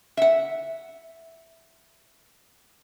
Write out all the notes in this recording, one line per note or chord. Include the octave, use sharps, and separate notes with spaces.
E5 F#5